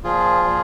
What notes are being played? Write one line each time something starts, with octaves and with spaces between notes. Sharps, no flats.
A#2 F3 F4 G#4
A#2 F3